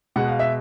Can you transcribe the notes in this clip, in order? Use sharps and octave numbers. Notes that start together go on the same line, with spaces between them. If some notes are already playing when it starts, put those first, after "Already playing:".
B2 G#3 F#5
F5
E5